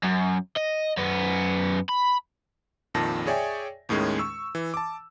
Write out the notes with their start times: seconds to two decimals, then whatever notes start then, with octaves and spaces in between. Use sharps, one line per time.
0.03 F#2
0.57 D#5
0.97 F#2 B3
1.89 B5
2.94 A#1 F2 A#2 D#3 A5 A#6
3.27 G#4 C#5 D5 E5 G5 G#5
3.89 D#2 A2 D#3 G#3 C#4
4.19 C#6 E6
4.55 E3
4.74 A5 D6